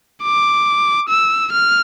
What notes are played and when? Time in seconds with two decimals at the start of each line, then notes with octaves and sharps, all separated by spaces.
0.23 D6
1.09 E6
1.52 F6